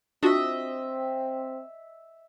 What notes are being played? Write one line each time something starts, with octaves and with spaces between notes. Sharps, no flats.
C4 D4 F4 F#4 D#5 E5